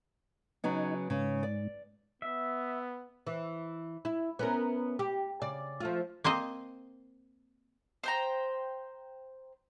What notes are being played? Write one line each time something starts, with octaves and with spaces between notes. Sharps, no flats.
C#3 F#3 B3 D#4
G#2 C#3
D5
B3 E5
E3
E4
B3 C#4 A#4
G4
C#3 D5
F3 A3 F4
A#3 C4 C5 D#5
C5 G5 A#5